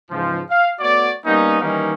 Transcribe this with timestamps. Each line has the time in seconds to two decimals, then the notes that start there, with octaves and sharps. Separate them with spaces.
0.10 G#2 C#3 E3 F3
0.50 F5
0.80 A3 B3 F#4 C#5 D5
1.25 G3 A#3 B3 C#4 D#4
1.61 D#3 E3 G3 A#3 C#4 D#4